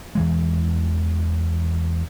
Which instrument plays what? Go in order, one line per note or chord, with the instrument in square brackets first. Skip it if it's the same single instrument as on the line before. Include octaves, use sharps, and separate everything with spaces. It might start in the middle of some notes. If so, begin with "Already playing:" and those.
[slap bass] E2 E3 G#3